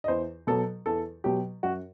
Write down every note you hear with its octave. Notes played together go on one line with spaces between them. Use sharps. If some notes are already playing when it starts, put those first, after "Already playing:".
D#5
E2 C5
B2 F#3 A4
E2 A4
B2 F#3 G4
F#2 F#4